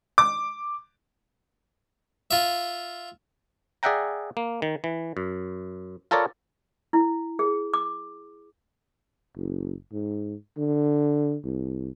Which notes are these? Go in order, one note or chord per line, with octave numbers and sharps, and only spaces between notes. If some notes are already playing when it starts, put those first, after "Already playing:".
D6
F4 E5
G#4 D5 E5 F#5 G5 A#5
A#3
D#3
E3
F#2
F4 A4 A#4 C#5 D5
E4
G#4
D6
F#1
G#2
D3
C2